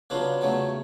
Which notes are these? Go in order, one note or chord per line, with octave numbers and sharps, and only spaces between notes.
C#3 F#3 B3 D4 F4
E2 C#3 F#3 A3